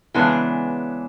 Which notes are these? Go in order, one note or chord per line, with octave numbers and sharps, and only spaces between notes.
C#3 E3 G#3 B3 D4